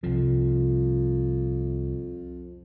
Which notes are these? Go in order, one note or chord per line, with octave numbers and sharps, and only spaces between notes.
C2 F2 F3